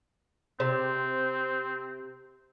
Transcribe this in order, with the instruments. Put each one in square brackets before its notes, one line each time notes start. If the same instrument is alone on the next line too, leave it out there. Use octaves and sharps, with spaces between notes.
[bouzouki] C3 [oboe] C4